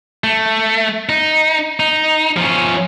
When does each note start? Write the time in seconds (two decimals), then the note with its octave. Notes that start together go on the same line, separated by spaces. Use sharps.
0.24 A3
1.09 D#4
1.80 D#4
2.37 F3 C#4